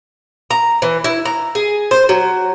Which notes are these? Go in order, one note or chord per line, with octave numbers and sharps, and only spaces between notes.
A#5
E3
E4
A#5
G#4
C5
F#3